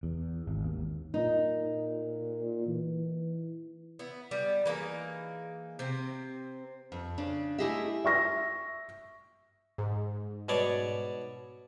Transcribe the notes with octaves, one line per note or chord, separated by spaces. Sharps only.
E2
G#1
D#2
A#2 D#4
E3
B3 E4
G3 B3
E3 A#3 D#4 G#4
C3 C4
F2
C#3 D4
A3 E4 G4 G#4 D#5 E5
E5 C#6 A#6
G#2
B2 C#5 D5